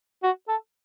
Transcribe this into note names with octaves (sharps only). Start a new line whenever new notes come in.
F#4
A4